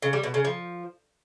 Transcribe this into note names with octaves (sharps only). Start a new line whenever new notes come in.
C#3
G3
B2
C#3
F3